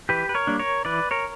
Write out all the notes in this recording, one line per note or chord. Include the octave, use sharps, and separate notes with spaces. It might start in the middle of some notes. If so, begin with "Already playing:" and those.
E3 G4 B4
B4
A#4 C#5
G3 A#3 D4
A#4 C#5
E3 B4 D5
A#4 C#5